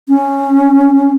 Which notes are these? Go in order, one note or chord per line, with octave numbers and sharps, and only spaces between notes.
C#4